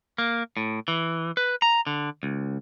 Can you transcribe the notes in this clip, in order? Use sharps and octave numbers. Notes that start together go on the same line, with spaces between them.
A#3
A2
E3
B4
A#5
D3
C#2